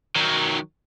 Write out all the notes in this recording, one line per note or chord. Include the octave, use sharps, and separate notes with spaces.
D#3 F#3